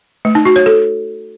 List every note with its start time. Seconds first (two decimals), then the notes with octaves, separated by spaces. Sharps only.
0.25 A3
0.35 D#4
0.45 F#4
0.56 C#5
0.66 A4